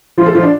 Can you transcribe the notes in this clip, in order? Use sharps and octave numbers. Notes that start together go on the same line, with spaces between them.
F3 F4
A3 A4
F3 F4
D4